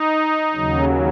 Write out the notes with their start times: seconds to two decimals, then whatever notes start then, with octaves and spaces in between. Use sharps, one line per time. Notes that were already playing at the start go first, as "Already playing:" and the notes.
Already playing: D#4
0.55 D#2 C#3 F#3